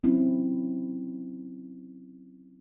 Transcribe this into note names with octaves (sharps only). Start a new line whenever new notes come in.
F#3 C4 C#4 E4